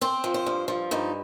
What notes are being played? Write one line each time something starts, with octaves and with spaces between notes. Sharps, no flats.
C4 C5
F3
C5
G2
F3
G2 D#4